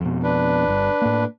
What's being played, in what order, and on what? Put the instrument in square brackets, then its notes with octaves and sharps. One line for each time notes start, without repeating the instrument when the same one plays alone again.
[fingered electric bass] F2 B2
[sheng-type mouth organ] D4 B4
[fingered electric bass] G1 G2
A2 A#3